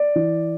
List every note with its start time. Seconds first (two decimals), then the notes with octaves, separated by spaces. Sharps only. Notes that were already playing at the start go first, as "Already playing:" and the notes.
Already playing: D5
0.16 E3